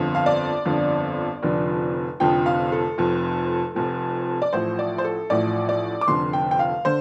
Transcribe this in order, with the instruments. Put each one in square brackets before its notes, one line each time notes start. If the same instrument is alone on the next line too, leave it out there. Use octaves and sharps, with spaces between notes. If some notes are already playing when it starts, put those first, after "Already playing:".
Already playing: [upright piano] G1 F2 D3
F5
D5
G1 F2 D3
F1 F2 D3 F3
F1 F2 D3 F3 G5
F5
A4
F1 F2 F3
F1 F2 F3
D5
A1 A2 F3 C5
D5
C5
A4
A1 A2 F3 D5
D5
D6
F1 F2 D3 C6
G5
G5
F5
D3 C5